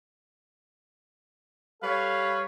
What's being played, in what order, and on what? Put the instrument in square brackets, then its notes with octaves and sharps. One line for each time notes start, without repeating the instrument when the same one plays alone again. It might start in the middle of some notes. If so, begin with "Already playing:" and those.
[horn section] G3 A4 B4 C#5 F5